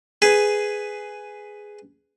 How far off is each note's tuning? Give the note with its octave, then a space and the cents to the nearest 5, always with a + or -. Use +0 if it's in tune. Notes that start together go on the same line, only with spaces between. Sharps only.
G#4 +0 B4 +10